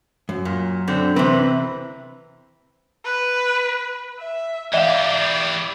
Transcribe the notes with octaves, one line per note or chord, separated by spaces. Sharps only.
F#2
A#2
B2 D3 C4
C3 E3 C4 B4
B4
E5
E3 G4 D5 E5 F5